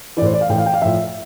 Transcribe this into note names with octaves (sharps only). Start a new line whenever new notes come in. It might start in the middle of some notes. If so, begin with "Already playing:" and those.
A2 E3 C5 D5
D5
F5
A2 E3 G5
F5
G5
F5
A2 F3 E5